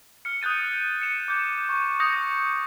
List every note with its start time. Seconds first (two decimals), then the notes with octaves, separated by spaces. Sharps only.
0.25 F6 C#7
0.42 D#6 F#6 G6 A6 D#7
1.01 C#7 E7
1.28 D6 G6
1.69 C#6
2.00 D#6 G6 A#6 C#7